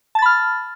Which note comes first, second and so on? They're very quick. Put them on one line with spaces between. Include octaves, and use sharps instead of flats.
A5 A6 B5 F6